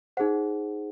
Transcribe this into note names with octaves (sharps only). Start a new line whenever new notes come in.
D#4 G#4 C5 F#5